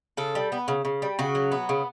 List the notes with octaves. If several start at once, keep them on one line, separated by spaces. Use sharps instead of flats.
C#3 A4
G3
B3
C#3
C#3
G3
C#3 F#4
F#3
B3
C#3